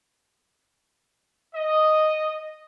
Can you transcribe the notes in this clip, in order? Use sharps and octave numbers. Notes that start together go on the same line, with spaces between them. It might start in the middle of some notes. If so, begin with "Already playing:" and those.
D#5